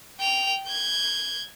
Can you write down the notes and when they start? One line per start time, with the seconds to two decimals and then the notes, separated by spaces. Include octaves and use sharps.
0.19 G5 F7
0.66 G6 G#6